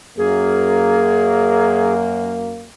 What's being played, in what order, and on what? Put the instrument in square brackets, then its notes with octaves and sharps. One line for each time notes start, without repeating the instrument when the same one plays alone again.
[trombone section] F#2 A#3 [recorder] G#4